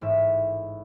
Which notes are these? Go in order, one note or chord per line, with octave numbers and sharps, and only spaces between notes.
A1 G#2 E5